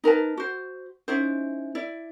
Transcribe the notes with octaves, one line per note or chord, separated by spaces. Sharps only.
D#4 A#4 B4 A5
F#4 C5
C#4 D#4 E4 C5
E4 D5